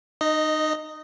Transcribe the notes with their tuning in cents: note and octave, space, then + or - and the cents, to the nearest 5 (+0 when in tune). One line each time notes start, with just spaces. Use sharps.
D#4 -25 D#5 +0